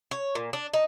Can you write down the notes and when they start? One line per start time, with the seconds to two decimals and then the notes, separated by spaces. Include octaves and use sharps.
0.11 C#5
0.35 A#2
0.53 D4
0.74 D#4